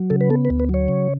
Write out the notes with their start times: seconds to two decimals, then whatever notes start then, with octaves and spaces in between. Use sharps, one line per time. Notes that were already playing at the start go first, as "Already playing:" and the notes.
Already playing: F#3
0.10 C#3 A4
0.21 B4
0.30 B3 A4
0.45 B4
0.50 D2
0.60 B4
0.69 F#3 C#5
0.88 C#3